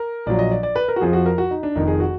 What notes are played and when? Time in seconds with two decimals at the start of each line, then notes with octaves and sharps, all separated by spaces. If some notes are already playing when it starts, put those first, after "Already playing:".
Already playing: A#4
0.26 A#1 A#2 F#3 D5
0.39 D#5
0.51 D5
0.63 D5
0.76 B4
0.88 A#4
0.96 F#4
1.01 F2 F3 G#4
1.13 F#4
1.26 A#4
1.38 F#4
1.51 D#4
1.63 D4
1.75 F1 F2 D#3 D#4
1.88 G#4
2.00 F#4